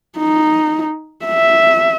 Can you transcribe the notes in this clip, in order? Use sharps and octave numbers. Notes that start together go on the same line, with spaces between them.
D#4
E5